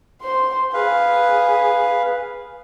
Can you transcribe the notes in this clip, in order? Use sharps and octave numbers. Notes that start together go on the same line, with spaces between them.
C5 C6
G#4 B4 F5